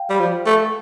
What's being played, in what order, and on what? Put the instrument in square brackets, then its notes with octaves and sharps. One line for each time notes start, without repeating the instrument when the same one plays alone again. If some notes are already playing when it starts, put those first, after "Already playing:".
Already playing: [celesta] F5 G5
[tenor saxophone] G3
F3
A3